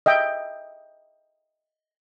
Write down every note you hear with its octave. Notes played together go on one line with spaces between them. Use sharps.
D#5 E5 G5